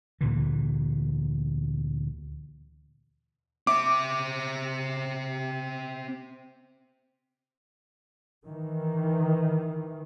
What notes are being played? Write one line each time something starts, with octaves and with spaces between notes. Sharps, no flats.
D2 A#2 D3 E3
C4 E5 D6
D#3 E3